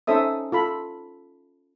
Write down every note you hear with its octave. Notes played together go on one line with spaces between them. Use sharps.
C#4 D#4 A4 C5 E5 D#6
F4 A4 B5